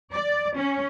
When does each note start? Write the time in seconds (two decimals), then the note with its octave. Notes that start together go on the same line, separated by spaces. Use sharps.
0.13 D5
0.57 C#4